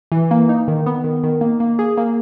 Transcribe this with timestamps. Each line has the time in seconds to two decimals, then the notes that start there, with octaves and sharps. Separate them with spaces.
0.12 E3
0.31 A#3
0.49 D#4
0.68 D#3
0.86 B3
1.04 D#3
1.23 D#3
1.41 A#3
1.60 A#3
1.79 G#4
1.98 A#3